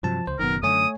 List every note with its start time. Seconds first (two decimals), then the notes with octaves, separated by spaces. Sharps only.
0.03 G2 C3 F3 F#3 A5
0.27 C#2 C5
0.39 F#1 F#2 B2 D#3 B3 A#4
0.63 F#2 D3 A3 C#5 G#5 D#6